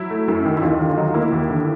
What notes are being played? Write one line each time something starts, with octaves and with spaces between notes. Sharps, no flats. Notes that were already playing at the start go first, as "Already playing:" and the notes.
Already playing: F#3 E4
A3
F#2
D#3
E4
D#2 D#4 F4
D3
D#4 F4
F#3
A#3 E4
D#2
D3